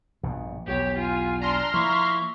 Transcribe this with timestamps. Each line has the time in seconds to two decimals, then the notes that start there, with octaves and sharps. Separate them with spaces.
0.23 A#1 G2 B2
0.67 B1 E2 G4 C#5
0.98 F4 G#5
1.42 D4 A#5 C6 F6
1.74 F3 A#3 E4 C#6